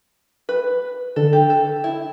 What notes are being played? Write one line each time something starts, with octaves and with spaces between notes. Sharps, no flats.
B4
D3 A4
G4
A4
E4